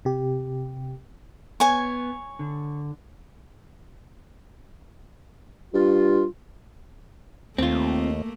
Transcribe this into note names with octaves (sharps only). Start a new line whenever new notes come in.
C3 G4
B3 C#5 G#5
D3
G2 F4
D#2 A3 A#3 C4 F4